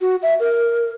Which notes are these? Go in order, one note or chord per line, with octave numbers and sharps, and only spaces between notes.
F#4
E5
A#4